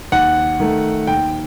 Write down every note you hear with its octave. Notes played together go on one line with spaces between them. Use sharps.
D#2 F#5
D#3 A3
D#2 G5